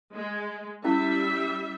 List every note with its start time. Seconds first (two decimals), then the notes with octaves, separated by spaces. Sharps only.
0.13 G#3
0.84 G3 C#4 E4 E5